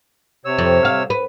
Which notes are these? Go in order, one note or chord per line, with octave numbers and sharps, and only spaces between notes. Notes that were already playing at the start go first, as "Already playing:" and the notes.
C3 C#5 E6
F2
F5
B4